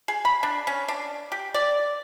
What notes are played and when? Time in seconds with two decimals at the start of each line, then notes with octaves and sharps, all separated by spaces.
0.08 G#4
0.25 B5
0.43 D4
0.67 C#4
0.88 D4
1.32 G4
1.54 D5